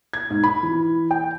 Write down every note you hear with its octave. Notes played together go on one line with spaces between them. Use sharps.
G#6
G#2
B5
E3
G5